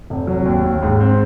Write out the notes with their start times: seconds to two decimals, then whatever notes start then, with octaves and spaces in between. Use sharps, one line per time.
0.10 F1
0.27 F#3
0.46 D#2
0.65 D#2
0.83 G#2
1.00 C4